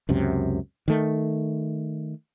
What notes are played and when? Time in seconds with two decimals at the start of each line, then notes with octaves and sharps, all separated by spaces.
0.09 C#2 F#2 C3
0.88 D#3 A3